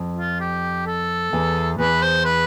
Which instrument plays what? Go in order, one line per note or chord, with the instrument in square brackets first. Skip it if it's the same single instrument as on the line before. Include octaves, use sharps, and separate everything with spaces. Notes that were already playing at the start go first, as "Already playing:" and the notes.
Already playing: [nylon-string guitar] F2
[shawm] F4
G4
A4
[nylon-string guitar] E2
[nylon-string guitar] E2 [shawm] B4
[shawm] C5
B4